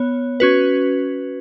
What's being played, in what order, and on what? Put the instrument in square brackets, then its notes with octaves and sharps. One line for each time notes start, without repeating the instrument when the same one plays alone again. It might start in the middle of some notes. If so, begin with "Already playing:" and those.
Already playing: [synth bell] B3 C#5
C#4 F#4 B4